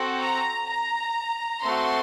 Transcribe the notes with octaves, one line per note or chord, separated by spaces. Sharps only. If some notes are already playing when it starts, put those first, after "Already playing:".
Already playing: C4 F#4 A4
A#5
A#5
A3 C4 F#4 A4 C6